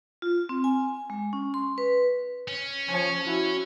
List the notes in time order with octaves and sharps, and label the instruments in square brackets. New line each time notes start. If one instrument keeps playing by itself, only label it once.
[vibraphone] F4
C4
G#5
G#3
C#4
C6
B4
[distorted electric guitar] C#4
[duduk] F3 [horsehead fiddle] C#5 G#5
[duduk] E4 [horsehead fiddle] F#4